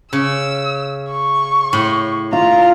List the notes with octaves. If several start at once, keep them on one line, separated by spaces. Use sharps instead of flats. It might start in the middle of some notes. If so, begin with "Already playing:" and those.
C#3 E6
C#6
A2
F4 A#5